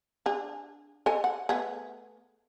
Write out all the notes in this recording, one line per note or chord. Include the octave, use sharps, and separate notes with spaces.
D4 G#4
A4 D#5 G#5
F#5
A3 B3 G#4